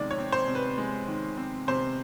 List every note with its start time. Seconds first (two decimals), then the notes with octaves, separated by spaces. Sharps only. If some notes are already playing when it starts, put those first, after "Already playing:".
Already playing: C3 D#3 G#3 D5
0.11 C#5
0.18 C4
0.32 C5
0.48 C3
0.55 B4
0.78 G#3
1.08 D#3
1.38 C4
1.68 C3 C5